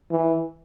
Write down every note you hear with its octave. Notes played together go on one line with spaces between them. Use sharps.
E3